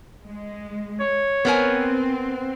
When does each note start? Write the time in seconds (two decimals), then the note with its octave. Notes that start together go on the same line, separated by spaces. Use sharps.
0.24 G#3
1.00 C#5
1.45 B3 C4 A#4 G#5